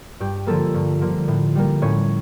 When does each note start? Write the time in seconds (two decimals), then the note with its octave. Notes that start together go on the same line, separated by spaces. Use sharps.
0.20 G2 G4
0.47 D3 F3 A#3 A4
0.74 G2
1.01 D3 F3 A#3
1.28 A2
1.56 G3 A#3
1.82 A2 C#4 C#5